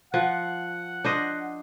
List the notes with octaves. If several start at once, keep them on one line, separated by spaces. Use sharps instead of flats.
F3 F#5
D4 C5 D#5